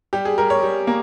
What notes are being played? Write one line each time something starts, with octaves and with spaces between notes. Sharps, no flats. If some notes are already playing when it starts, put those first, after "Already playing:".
G3 G4
G#4
G3 A#4
C#5
G3
A#3